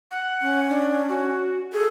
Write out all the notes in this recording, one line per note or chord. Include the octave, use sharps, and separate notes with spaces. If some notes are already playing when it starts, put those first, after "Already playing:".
F#5
C#4
D4
F#4
G#4 A4